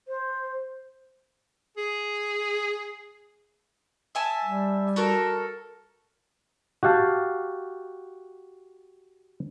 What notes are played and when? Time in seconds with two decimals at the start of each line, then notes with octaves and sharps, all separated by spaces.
0.08 C5
1.77 G#4
4.15 E5 G#5 A5
4.44 G3
4.96 F#4 A4 A#4
6.83 F#4 G4 F5 A5